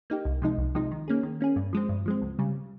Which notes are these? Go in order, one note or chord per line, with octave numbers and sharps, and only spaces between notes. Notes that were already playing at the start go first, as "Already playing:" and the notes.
A#3 D#4 G4
C2
C3 F3 G#3 D#4
C2
C3 F3 G#3 D#4
D#3
A#3 C#4 G#4
D#3
A#3 C#4 G#4
G2
F3 G#3 C4
G2
F3 G#3 C4
C#2
C#3 G3